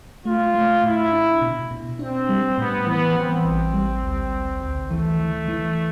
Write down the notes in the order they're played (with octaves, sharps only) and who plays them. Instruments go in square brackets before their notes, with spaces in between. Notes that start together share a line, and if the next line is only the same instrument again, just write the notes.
[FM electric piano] A3 [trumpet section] F4
[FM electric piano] A3
[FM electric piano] A2 [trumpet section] E4
[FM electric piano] D4
B2
B2
[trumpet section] C4 [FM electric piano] D4
[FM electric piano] G3
[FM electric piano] A2 [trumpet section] B3
[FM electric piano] E3 [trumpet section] B3
[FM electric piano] E3 [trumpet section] C4
[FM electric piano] A1
G3
D2
D2
D2
[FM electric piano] E3 [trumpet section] A3
[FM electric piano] E3
E3